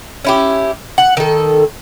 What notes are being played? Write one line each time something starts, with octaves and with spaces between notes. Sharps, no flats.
C#4 E4 G4
F#5
D#3 A4